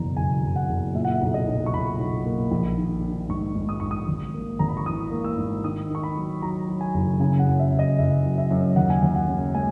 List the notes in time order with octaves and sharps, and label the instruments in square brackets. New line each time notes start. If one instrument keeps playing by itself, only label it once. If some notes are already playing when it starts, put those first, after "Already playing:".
Already playing: [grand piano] F#1 E2 B2 A#5
F#1 G#5
F#1
F#5
F#1
A#2 E5
F#5
E5
B1
D#5
B1
C#6
B1 B5
B1
A#3
A#1
D#3
D#3
G#2 C#6
G#2
D#6
G#2 C#6
D#6
G#1
A#3
G#1 A#5
B5
C#6
E3 D#6
A#3
E6
G#2
D#3 D#6
D#3 C#6
B5
F#3
F#3 A#5
F#3
G#5
F#1
C#3 G#5
F#5
F#2
E5
F#1
D#5
F#1 E5
F#3
E5
F#2
D#2 F#5
G#5
D#2 F#5
F#5
C#3
G#3 G#5